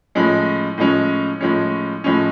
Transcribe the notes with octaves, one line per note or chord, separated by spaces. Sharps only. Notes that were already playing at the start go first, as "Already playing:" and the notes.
A2 F3 G#3 C#4
A2 F3 G#3 C#4
A2 F3 G#3 C#4
A2 F3 G#3 C#4